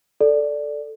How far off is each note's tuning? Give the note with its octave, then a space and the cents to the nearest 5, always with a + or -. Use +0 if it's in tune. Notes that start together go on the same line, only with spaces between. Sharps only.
A4 +0 D5 +0